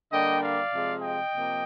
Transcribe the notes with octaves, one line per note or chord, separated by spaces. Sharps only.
D3 G3 A#3 D#5 G5
D5 F5
C3 F3 G#3
D#5 G5
C3 F3 A#3